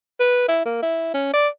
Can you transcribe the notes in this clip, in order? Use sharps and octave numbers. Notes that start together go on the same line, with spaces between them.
B4
E4
A#3
E4
C#4
D5